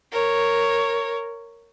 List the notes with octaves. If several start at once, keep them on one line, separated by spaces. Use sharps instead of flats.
A#4 C#5